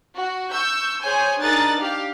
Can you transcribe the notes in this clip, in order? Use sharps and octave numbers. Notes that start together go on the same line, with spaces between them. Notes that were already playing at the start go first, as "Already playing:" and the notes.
F#4
C#6 E6 G6
G#4 C5 C#5 G#5 G6
D4 D#4 G#4 A#4 F#6 A6
G4 F5